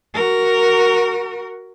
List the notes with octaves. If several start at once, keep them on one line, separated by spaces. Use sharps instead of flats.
F#4 A#4